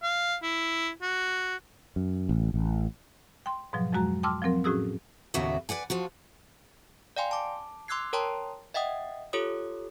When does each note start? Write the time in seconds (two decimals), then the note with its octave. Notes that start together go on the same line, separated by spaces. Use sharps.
0.03 F5
0.42 E4
1.02 F#4
1.96 F#2
2.29 A1
2.54 A1
3.46 G5 C6
3.73 G#2 B2 F3 F#3
3.92 F2 F#3 G#3 F#4 A#5
4.23 G5 A5 C6 D6 E6 F6
4.42 F3 F#3 C4 A#4
4.64 A2 C#4 F#4 G#4 D#6 E6
5.34 D#2 A2 C#3 B3 F#4 E5
5.69 B4 D5 F#5 G#5
5.90 F3 F4 F#4
7.16 D5 F5 G5 G#5 C6
7.31 A5 D6
7.88 C6 D6 E6 F#6 G#6 C7
8.13 A#4 C#5 G5 A5 A#5 C6
8.74 D#5 E5 F#5 G5 D#6
9.33 F4 G4 A4 C#5 D#6